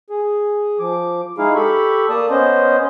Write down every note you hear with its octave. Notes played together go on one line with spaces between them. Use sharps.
G#4
F3 D6
G#3 D#4 E4 G#4 F5
G4 A4 B5 C#6
A#3 D5 A5 D#6
B3 C#4 C5 D#5